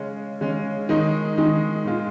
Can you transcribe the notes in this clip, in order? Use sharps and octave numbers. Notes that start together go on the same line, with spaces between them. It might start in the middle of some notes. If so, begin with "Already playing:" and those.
Already playing: C#3 G#3 C#4
C#3 G#3 C#4
D#3 G#3 D#4
D#3 G#3 D#4
A#2 G#3 F4